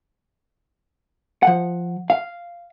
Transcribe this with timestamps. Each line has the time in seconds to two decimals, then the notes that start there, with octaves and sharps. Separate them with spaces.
1.43 F3 F#5
2.10 F5